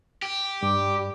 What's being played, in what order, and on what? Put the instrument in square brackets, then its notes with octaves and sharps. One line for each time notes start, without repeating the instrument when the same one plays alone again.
[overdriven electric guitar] G4
[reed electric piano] G2 [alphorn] G3 [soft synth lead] D6